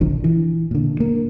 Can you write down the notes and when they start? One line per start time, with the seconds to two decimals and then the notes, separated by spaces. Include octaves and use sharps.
0.01 A#1 D3 F3
0.24 E3
0.71 A#2 D3
1.00 A#3